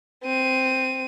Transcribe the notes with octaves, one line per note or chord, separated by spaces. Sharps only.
C4 D#7